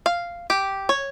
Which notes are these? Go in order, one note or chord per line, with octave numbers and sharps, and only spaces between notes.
F5
G4
C#5